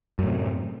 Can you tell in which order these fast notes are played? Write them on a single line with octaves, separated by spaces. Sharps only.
F#2 A2 C3